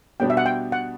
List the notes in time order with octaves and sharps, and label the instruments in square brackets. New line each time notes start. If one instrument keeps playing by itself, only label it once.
[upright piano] B2 G3 B3 D4 F#4 [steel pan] G5
[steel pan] E5
F#5
G5
F#5